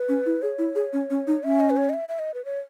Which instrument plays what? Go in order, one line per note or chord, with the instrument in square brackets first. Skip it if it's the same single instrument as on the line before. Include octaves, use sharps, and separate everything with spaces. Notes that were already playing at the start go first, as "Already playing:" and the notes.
Already playing: [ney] B4
[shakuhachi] C#4
E4
[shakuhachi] G#4 [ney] C#5
[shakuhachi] E4
G#4
C#4
C#4
D#4
[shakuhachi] C#4 [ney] E5
[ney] D#5
B4
C#5
D#5
E5
E5
D#5
B4
C#5